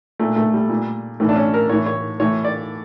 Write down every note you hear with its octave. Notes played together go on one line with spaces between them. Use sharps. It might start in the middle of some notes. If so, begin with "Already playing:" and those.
A#2 A3
A3
G3
A#2
A2 E3 A3
D4
C#4
A#4
A2 E3 C#5
C#5
A2 E3 C#5
D5